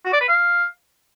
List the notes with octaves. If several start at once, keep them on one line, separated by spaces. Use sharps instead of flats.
F#4
D5
B4
F5